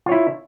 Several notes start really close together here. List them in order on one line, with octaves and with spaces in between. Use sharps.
F4 C#5 E4